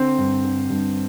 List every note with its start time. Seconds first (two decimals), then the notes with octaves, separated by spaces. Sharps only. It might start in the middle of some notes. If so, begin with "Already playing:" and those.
Already playing: D3 C4 C5
0.18 G2
0.44 D3
0.70 G2